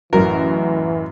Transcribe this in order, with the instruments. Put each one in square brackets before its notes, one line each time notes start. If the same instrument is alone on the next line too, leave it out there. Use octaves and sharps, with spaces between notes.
[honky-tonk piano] A1 F#2 F#4 [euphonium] E3 [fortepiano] A#4